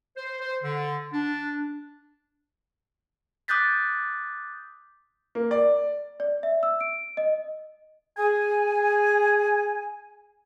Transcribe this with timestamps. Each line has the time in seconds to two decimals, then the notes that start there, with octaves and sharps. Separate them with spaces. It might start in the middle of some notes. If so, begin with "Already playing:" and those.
0.17 C5
0.41 C5
0.63 D3
1.13 D4
3.48 D6 D#6 F#6 G6 A6 B6
5.35 A#3
5.51 D5
6.20 D5
6.43 E5
6.63 E6
6.81 D7
7.17 D#5
8.18 G#4 G#5